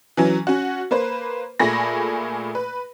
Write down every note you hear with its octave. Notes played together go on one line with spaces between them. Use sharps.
E3 F#3 C#4
C#4 F#4
A#3 B4 C5
A#2 A3 G#4 B5 A#6
B4